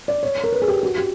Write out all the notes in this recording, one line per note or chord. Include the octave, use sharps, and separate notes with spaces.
D5
C#5
A#4
B4
G#4
G4
F#4
G4